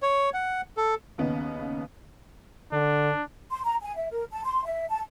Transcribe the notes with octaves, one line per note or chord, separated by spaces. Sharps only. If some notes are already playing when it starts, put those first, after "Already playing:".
C#5
F#5
A4
D#2 C#3 B3 C#4 D#4
D3 D4
C6
A#5
G#5
E5
A#4
A5
C6
E5
A5